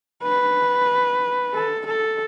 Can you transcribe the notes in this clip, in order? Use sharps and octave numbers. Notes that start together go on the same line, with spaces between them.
B4
A4
A4